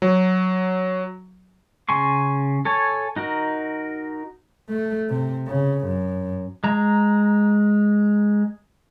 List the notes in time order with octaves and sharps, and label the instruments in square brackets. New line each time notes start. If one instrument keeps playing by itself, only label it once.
[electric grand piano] F#3
[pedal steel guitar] C#3 G#5 C6 C#6
A4 C#5 G#5
D#4 F#4 A#4
[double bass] A3
C3
C#3
F#2
[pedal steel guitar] G#3 A#5